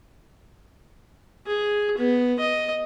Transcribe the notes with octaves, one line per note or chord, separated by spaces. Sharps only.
G#4
B3
D#5